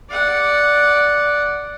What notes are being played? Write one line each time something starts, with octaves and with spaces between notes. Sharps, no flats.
D5 F#5